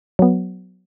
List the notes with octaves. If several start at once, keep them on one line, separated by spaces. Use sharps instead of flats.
F#3 B3